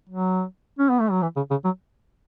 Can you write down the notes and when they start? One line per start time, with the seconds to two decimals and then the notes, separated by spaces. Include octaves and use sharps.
0.09 F#3
0.79 C#4
0.89 B3
1.00 A3
1.11 F#3
1.22 E3
1.36 C#3
1.50 C#3
1.64 F#3